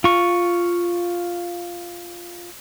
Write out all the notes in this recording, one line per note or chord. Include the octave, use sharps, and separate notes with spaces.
F4 C#6